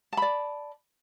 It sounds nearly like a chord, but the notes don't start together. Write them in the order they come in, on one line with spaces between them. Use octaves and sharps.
A5 B5 D5